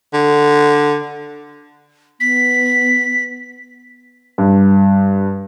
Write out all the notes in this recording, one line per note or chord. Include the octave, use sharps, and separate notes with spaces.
D3
B3 B6
G2